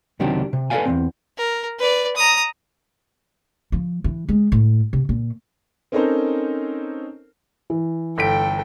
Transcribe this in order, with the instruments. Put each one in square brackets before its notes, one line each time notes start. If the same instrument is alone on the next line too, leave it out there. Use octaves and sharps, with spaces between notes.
[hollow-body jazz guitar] C#2 C3 D#3 F#3 D4 G4
C3
A4 B4 C#5 D5 F5 G#5
E2 C#3 C4
[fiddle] A#4
B4 D5
A#5 D#6
[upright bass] F3
E3
G#3
A2
C3
A#2
[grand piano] C4 C#4 D#4 A4 A#4 C5
[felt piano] E3
[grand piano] G1 B6 D7 [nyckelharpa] A4 G5